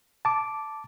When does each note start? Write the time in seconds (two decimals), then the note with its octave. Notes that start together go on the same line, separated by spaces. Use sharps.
0.25 A5 D6